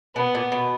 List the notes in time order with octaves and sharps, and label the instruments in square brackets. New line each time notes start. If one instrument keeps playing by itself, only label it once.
[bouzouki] B2 [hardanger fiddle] B3
[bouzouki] A#2
B2